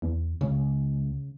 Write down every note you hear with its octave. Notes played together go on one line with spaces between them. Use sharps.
E2
C#2 C#3